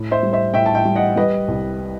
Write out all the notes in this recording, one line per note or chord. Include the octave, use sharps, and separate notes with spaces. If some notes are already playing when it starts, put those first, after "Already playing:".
Already playing: A2
C5 E5
G3
C5 E5
A2 E5 G5
A5
E5 G5
G3
D#5 F#5
G3 B4 D#5
C2